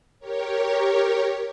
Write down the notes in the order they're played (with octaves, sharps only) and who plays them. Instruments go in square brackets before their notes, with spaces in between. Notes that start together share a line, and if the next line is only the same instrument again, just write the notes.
[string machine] G4 A#4 C#5